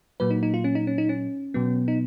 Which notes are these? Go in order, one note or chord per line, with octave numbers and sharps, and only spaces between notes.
A#2 F#3 A#3 B4
D#4
D#4
F4
C#4
D#4
C#4
D#4
C#4
B2 F#3 B3
D#4